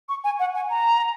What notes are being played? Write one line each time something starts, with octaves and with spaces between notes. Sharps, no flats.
C#6
G#5
F#5
G#5
A#5